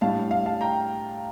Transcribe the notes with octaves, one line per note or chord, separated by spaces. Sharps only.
A2 G3 D4 F5 A5
F5
F5 A5
G5 A#5